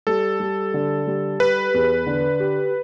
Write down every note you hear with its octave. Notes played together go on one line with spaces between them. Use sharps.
G3 A4
G3
D3
G3
G4 B4
E2
D3
G4